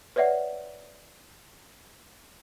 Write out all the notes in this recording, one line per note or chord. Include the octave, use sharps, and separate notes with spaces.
B4 C#5 D5 E5 F#5